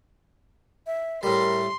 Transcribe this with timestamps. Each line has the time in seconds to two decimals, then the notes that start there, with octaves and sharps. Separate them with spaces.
0.86 E5
1.23 A2 G3 A#4 C6